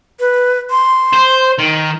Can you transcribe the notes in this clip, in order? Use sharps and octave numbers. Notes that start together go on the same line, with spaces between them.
B4
C6
C5
D#3